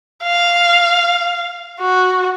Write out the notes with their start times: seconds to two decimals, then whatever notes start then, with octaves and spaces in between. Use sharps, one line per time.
0.23 F5
1.80 F#4